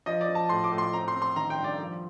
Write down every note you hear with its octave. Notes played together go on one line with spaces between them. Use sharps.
F3 D#5
D5
F3
A5
A2 C6
D6
A2
C6
C4 A#5
C6
C4
C6
D#3 A#5
G5
G2
D5
F3